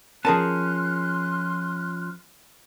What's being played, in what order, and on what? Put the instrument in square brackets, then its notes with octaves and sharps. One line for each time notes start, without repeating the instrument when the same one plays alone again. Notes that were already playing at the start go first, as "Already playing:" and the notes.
[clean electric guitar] F3 C#4 [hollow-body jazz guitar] G#4 A#4 A5 [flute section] C6 F6 F#6